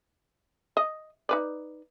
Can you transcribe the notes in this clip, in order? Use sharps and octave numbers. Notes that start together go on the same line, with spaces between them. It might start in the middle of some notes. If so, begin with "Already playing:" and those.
D#5
D#4 B4 D5